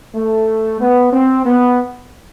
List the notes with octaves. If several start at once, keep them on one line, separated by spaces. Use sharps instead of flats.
A3
B3
C4
B3